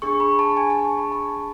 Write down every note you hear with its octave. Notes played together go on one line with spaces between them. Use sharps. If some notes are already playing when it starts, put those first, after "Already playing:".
D4 G#4 C#6
B5
A5
G#5
A5
C#6
B5
A5